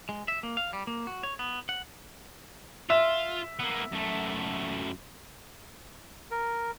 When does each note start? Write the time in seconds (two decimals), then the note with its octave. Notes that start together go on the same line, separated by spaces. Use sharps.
0.09 G#3
0.28 E5
0.43 A#3
0.57 F5
0.73 G3
0.87 A#3
1.07 F#4
1.23 C#5
1.39 B3
1.69 F#5
2.90 F4 E5 E7
3.59 A#3 B3
3.92 F#2 A3
6.31 A#4